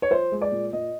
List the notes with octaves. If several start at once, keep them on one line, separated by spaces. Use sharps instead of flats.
C#5
F3 C5
G#3
D5
A#2
A#2 D#5